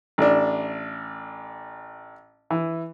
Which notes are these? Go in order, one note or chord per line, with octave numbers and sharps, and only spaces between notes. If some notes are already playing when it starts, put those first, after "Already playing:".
A1 D4
E3